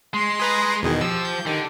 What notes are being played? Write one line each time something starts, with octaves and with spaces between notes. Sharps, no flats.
G#3 C6
G#4 B4 A#5
E2 B2 D#3 G#4
F3 G4 E6
G6
D3 D#3 G4